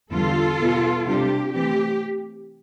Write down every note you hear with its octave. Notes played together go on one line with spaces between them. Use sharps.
E2 D3 G3 F4 A4
B2 G3 B3
C3 G3 D4 F4 G4
E3 A3 C4 G4